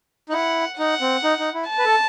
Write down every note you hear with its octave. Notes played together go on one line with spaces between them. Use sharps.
D#4
E4 F#5
D#4 F#5
C4
D#4
D#4
E4
A5
B4
A4